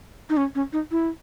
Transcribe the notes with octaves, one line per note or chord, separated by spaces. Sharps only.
D#4
C#4
C#4
D#4
E4